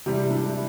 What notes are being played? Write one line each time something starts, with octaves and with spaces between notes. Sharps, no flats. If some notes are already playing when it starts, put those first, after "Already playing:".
C3 E3 G3 G4
E4
D4
E4
E4